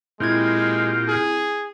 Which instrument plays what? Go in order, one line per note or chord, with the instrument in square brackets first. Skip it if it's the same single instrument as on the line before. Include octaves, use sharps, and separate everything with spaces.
[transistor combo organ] A#2 F4 G4 [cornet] G#3 [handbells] C4 E4 G#6
[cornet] G#4